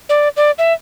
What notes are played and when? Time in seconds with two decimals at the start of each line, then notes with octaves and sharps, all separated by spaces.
0.09 D5
0.37 D5
0.58 E5